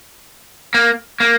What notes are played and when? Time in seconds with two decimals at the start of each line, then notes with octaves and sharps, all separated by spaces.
0.74 A#3
1.20 A#3